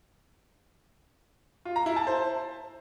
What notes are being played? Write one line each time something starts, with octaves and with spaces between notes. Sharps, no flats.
F4
A#5
E4
A5
C5